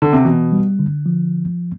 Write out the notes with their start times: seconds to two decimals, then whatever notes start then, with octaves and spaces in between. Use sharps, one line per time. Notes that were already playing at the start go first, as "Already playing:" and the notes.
0.02 D3
0.13 C3
0.25 B2 E3
0.52 G3
0.79 D3
1.06 F3